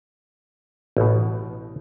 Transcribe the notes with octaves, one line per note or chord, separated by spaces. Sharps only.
A1 B2